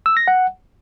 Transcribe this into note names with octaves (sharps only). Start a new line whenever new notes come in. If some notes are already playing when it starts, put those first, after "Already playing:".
E6
A#6
F#5